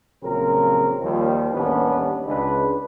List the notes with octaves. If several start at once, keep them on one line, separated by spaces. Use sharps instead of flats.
A#1 C#3 F#3 C4 A#4
D#2 F3 G3
A1 D#2 G3 B3 C#4 D4
C#2 D4 B4